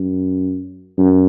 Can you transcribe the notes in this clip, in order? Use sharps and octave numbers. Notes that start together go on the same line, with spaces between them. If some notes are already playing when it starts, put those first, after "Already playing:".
Already playing: F#2
F#2